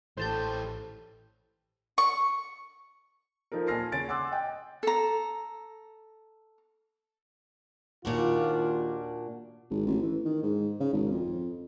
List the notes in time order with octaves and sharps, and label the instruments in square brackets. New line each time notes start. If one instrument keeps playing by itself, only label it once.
[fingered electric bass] A1 [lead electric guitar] E3 G4 [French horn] A4 [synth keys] C5 A5 G6
[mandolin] C#6
[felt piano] F3 D#4 A4 A#4
A#2 G#5 A5 F6 A#6 C7
C#3 C#5 G#5 A6 D7
F#5 G#5 C6 D6 E6 F#6
D#5 G5
[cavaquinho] A4 A#5
[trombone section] D#2 F4 [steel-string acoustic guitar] A#2 D4 F#4
[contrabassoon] G#1
A1
E3
D#3
G#2
C#3
G#1
F2